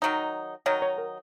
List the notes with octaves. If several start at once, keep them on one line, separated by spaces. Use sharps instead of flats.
D#3 F#3 D#4 D#5
D#3 F#3 D#4 C#5
C#5
A#4